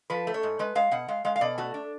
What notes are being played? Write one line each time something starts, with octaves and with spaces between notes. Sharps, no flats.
F3 B4
A3
C#5
G#2
G#3 B4
G#3 F5
B2 F#5
G#3 F5
G#3 F5
F5
B2 D5
A3 F#4
D4